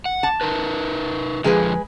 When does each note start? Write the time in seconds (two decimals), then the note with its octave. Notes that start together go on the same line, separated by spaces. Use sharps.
0.06 F#5
0.23 A5
0.41 D#4 A#4 B4
1.44 F2 D3 F3 G#3 G#4 B4